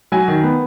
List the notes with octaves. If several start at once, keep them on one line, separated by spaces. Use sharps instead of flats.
F#3 G#5
D#3
B3